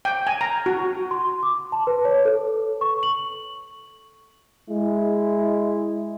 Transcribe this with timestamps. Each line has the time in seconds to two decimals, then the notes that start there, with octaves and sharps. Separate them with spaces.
0.05 G5
0.27 G#5
0.41 A#5
0.66 F#4
1.11 C6
1.43 D6
1.72 A5
1.87 B4
2.05 C#5
2.25 A4
2.81 C#6
3.03 F#7
4.70 G#3 E4